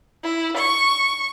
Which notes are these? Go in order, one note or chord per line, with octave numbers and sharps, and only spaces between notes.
E4
C#6